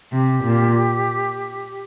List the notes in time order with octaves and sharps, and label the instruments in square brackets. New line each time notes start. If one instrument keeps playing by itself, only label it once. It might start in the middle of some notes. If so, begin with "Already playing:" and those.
[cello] C3 [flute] G4
[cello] A#2